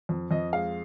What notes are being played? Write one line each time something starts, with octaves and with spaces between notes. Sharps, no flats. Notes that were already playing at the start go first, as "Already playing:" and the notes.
F2
F2 D#5
G#3 F5